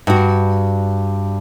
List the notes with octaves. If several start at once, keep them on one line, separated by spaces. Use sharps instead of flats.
G2 F#4